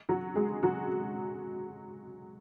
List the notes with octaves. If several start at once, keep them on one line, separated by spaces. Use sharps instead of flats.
F#3 F#4
G#3 G#4
F#3 F#4